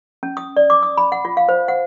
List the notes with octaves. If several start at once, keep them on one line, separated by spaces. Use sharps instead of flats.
C#4
D#6
D5
D6
D#6
B5
F#5
F4
F5
C5
F#5